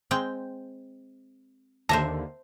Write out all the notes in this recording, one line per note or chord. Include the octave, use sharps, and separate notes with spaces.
G#3 C4 G5
D#2 D3 C5 E5 A5 A#5